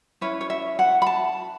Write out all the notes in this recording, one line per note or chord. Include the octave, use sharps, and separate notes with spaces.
C#4 E4 B4 C#5
C#5
E5
F#5
B5
A5